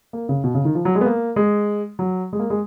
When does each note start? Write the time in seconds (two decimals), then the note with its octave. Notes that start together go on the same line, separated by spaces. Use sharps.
0.13 A#3
0.29 C#3
0.44 B2
0.54 C#3
0.65 D#3
0.75 F3
0.85 F#3
0.95 G#3
1.01 B3
1.06 A#3
1.36 G#3
1.99 F#3
2.33 G#3
2.39 A#3
2.50 G#3